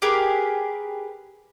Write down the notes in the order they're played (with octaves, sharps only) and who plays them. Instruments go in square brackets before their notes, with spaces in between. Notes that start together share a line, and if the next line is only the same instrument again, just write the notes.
[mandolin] G4 G#4 A#4 B4